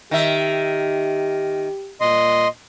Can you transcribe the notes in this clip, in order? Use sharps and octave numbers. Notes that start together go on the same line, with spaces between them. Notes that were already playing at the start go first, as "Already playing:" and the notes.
D#3 G4 E5
A#2 D#5 C6